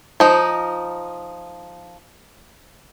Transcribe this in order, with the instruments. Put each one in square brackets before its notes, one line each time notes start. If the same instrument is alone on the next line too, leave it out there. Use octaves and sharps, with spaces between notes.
[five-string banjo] F3 D#4